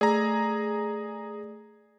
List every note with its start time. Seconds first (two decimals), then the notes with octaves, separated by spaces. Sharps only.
0.01 A3 G#4 D5 A#5 E6